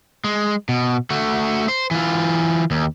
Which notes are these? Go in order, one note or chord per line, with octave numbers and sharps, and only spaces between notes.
G#3
B2
A3 F#4
C5
E3 F4
D#2